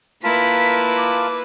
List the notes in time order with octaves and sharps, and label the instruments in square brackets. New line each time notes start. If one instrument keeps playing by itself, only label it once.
[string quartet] A#3 E4 [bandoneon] F4 A#4 A5 [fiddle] B4 [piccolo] B6
[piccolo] D6